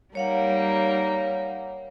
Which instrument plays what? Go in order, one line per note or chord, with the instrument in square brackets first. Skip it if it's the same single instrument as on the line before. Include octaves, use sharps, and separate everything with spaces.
[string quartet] G3 A#3 D#4 [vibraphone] C#5 F5 F#5